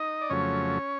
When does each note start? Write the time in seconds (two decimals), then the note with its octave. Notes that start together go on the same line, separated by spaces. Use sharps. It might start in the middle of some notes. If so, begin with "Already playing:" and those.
Already playing: D#4 D#5
0.21 D5
0.30 F2 C#3 F#3 A3 C#4 C#5